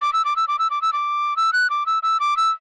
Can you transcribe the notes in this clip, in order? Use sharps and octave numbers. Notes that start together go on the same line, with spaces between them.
D6
E6
D6
E6
D6
E6
D6
E6
D6
E6
F#6
D6
E6
E6
D6
E6